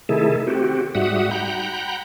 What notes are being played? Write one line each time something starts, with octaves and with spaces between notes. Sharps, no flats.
C3 D#3 A3 E4 G#4 A4
C4 F#4 G4
G#2 G3 F#4 E5 F#5 D#6
F#5 G5 A#5 B5 G6